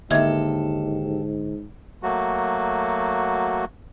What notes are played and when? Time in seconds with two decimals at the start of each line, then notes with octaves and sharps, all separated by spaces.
0.10 D#2 G#2 D3 A4 E5 G#6
2.03 F#3 A3 A#3 F#4